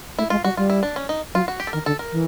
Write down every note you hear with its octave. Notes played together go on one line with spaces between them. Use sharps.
A3 E4
G#3 F4
G3 F#4
G3 F4
E4
D4
C#4
D#4
F#3 F4
F#4
G4
A4
D#3 A#4
D3 A4
A#4
E3